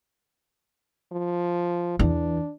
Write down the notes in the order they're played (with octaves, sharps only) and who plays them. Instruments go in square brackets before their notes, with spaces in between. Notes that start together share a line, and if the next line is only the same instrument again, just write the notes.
[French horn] F3
[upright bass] E2 E3 [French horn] D4